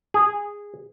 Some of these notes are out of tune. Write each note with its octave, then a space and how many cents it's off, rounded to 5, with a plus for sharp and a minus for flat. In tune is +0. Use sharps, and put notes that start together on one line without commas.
G#4 -15